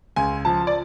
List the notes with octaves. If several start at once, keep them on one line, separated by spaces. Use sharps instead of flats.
C#2 G#5
F3 A5
D5